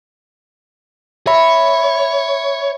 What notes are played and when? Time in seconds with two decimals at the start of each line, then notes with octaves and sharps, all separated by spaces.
1.27 C#5 E5 B5